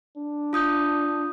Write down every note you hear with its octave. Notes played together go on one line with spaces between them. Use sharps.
D4
F4 D#6 G6